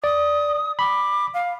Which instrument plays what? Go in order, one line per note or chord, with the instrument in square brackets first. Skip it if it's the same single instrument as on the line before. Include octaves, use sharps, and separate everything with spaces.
[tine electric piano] D5 [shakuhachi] D#6
[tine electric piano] B5 [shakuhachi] D6
[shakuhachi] F5